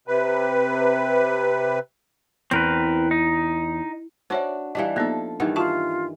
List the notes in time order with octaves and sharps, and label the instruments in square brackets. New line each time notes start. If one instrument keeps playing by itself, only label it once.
[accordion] C3 B4
[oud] E2 [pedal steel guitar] C4 A#4 B4
[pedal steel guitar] D#4
[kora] D4 F#4 [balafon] C5 C#5 E5
[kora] E3 G3 D4 [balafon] D#5 F5
[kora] F3 A4 [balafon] A#3 B3 D#4
[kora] G2 D#3 E3 [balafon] F#5
[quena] F4 [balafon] F#4 A5 C#6